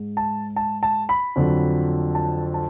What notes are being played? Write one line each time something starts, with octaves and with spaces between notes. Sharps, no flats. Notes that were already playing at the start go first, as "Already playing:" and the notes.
Already playing: G#2 G#3
A5
A5
A5
B5
F2 D3 F#3
A5
A5